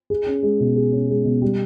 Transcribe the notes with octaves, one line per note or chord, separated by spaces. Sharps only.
G#4
C#4
G#3
B2
G#4
C#4
G#3
B2
G3